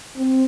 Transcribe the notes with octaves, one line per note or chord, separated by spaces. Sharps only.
C4